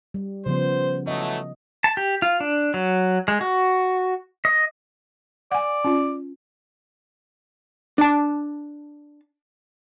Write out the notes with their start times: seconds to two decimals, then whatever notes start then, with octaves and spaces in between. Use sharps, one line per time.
0.14 G3
0.46 C#3 F3 B3 C5
1.07 E3 F#3 A3 D#5
1.84 A5
1.97 G4
2.22 F4
2.40 D4
2.74 F#3
3.28 G#3
3.41 F#4
4.45 D#5
5.52 D5 F#5 G#5
5.84 C#4 F4
7.98 D4 A5